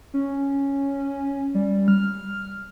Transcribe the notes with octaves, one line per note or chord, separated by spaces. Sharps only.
C#4
G3
F6